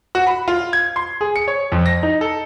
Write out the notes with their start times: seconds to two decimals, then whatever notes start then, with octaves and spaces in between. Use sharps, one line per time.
0.15 F#4
0.27 B5
0.48 F4
0.73 G#6
0.96 C6
1.21 G#4
1.36 C#7
1.48 C#5
1.72 F2
1.86 A#6
2.03 D#4
2.21 A4